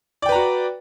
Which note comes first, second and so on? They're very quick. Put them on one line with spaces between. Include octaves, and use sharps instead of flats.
D5 G5 B4 A#5 F#4